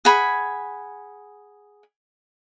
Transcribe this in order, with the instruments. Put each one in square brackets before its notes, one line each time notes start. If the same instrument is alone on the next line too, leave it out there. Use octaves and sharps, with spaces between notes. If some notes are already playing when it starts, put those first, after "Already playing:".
[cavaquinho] G#4 F#5 G#5 B5